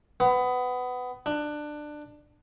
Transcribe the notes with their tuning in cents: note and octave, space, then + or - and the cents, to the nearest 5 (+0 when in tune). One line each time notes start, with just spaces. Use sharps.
B3 +20
D4 +20